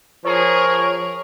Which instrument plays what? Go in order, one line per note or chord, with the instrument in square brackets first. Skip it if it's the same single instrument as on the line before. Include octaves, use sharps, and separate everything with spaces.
[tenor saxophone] F3 [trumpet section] G#4 A#4 [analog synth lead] C#5 [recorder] C#6